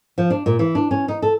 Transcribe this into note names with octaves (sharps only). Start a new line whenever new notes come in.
F3
D4
A#2
E3
D4
C#4
D#4
A4